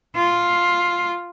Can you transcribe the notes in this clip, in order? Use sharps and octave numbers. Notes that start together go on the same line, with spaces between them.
F4